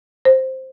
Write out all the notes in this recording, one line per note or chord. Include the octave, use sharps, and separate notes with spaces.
C5